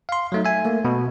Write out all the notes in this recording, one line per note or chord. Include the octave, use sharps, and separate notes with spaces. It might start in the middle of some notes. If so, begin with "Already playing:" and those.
F5 C6
F#3 A3 D#4
E5 G#5
A3 A#3
B2